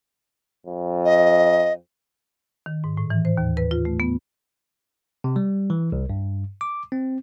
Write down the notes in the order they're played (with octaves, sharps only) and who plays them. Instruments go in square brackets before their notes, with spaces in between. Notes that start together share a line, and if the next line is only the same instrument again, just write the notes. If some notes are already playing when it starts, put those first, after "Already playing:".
[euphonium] F2
[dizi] D#5
[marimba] D#3
G#2
A2
E3
C5
D#2
B4
F4
A3
B3
[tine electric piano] C3
G3
E3
C2
G2
D6
C4